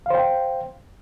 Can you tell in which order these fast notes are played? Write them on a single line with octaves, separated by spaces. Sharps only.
F5 C5 G5